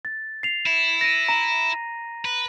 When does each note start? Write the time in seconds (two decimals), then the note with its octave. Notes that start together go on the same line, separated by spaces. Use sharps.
0.05 A6
0.43 C7 F7
0.66 E4
1.01 A#6 D#7
1.29 A#5
2.25 B4